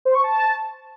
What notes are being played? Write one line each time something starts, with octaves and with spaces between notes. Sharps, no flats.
C5
C#6
A5